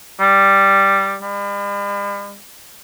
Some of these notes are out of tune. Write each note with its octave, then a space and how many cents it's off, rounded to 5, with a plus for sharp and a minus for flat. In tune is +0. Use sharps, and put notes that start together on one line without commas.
G3 +0
G3 +45